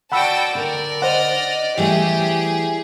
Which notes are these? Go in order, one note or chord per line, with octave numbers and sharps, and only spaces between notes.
F#4 D5 F#5 G5 A5 B5 E6
D3 A#4 D5
C5 D#5 F#5 F6
E3 G3 A3 G4 G#4